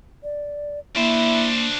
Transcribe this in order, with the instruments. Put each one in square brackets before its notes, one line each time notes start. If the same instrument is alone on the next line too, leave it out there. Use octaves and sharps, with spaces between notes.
[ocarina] D5
[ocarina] A#3 [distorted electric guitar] D4 C5 [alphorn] E4